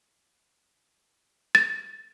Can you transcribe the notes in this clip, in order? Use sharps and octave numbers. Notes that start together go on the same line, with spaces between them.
A6